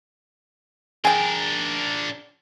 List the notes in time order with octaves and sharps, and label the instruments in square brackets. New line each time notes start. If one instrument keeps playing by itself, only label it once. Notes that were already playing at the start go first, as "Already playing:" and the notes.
[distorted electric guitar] D4 A#4 [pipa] G#4 G5